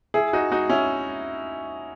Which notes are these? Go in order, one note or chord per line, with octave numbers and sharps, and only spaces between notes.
E4 G#4
D#4 F#4
D#4 F#4
C#4 E4